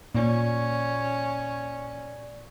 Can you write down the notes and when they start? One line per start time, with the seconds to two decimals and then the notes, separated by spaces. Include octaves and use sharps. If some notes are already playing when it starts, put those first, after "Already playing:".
0.15 A#2 C#4 D5